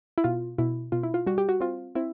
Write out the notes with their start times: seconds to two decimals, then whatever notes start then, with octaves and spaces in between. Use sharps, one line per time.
0.18 E4
0.24 B2 F4
0.58 B2 E4
0.92 B2 F4
1.03 E4
1.14 F4
1.26 G3 F#4
1.38 G4
1.49 F#4
1.60 C4 F4
1.95 C4 E4